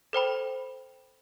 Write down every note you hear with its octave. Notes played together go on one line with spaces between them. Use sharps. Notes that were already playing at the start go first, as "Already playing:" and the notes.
A4 C5 G5 B5